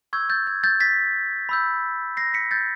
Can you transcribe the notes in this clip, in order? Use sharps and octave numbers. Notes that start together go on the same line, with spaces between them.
C#6 E6 G6 G#6
G6 A6
G#6
G6 A6
A6 B6
B5 E6 G6
A#6 C7
B6 C#7
G6 A6